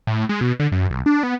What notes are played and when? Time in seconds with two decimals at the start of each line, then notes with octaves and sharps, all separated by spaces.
0.07 A2
0.29 G#3
0.41 B2
0.59 D3
0.72 F#2
0.91 C2
1.06 D4
1.23 B3